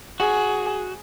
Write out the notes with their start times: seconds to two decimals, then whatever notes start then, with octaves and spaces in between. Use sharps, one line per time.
0.20 F#4 G#4